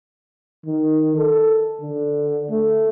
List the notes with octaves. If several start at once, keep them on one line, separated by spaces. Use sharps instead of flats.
D#3
A4
D3
A3